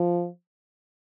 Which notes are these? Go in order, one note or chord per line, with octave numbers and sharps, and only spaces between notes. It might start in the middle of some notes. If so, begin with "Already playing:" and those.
Already playing: F3